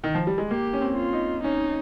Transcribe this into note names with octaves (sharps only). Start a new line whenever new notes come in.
D#3
F3
G3
G#3
A#3 G4
C#4
C4
F4
D#4
C#4 D#4